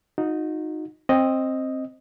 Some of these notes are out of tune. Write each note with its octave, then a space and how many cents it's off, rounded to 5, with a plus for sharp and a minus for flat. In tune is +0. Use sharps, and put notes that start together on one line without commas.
D#4 +0 F#4 -35
C4 +15 D#5 +0